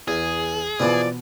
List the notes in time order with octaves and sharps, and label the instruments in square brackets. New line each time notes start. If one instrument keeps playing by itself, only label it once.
[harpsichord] E2 [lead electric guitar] G#4
[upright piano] B2 B4 [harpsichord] E3 F3 [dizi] D5